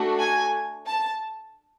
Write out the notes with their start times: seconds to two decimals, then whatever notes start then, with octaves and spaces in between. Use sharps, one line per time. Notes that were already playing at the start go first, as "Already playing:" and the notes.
Already playing: A3 D4 F#4 A4
0.19 G#5
0.87 A5